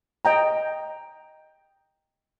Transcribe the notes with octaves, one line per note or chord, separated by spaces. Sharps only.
D#5 G5 A#5